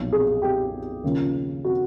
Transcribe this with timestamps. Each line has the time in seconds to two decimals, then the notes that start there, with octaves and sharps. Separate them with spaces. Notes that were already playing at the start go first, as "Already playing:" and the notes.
Already playing: B1 A#2 F3
0.12 G#4
0.42 G4
1.04 D#2 C#3 F3
1.64 F#4